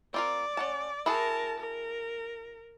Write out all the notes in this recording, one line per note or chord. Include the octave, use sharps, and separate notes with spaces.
C4 F4 A#4 D5
C#4 F#5 A5
E4 F#4 G#4 A#4 A5
A#4